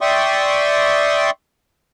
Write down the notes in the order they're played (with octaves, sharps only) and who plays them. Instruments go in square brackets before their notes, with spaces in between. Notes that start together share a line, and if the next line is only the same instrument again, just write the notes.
[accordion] D5 E5 G5 C6 C#6 D#6